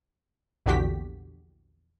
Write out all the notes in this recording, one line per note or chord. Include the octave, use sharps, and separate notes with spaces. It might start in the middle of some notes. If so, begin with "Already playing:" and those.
A#1 E2 D3 F#4 G4 B6